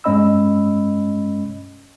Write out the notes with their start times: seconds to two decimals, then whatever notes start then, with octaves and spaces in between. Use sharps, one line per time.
0.04 G2 G#3 C#4 D#5 B5 E6